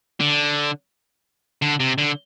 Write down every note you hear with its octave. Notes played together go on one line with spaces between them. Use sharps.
D3
D3
C3
D3